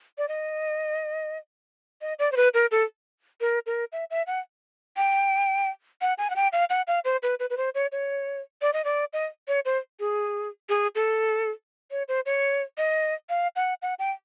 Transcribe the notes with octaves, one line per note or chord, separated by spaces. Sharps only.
D5
D#5
D#5
D5
C5
B4
A#4
A4
A#4
A#4
E5
E5
F#5
G5
F#5
G#5
F#5
G5
F5
F#5
F5
C5
B4
B4
B4
C5
C#5
C#5
D5
D#5
D5
D#5
C#5
C5
G#4
G#4
A4
C#5
C5
C#5
D#5
F5
F#5
F#5
G5